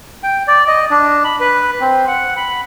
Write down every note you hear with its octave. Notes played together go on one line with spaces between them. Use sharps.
G5
D5
D#5
D4
B5
B4
C4
F#5
B5